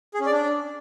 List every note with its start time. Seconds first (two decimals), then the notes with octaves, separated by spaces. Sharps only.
0.14 G#4
0.20 C#4
0.26 D5
0.32 D4